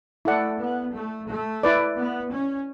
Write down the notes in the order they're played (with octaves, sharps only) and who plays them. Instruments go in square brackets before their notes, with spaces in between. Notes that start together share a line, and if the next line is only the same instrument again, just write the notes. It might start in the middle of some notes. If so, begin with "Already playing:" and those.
[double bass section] A3 [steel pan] E4 A4 D5 F#5
[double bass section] B3
A3
A3
[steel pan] E4 B4 D5
[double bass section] B3
C#4